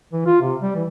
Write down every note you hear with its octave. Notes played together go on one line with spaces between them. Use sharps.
E3
F4
C3
G3
E3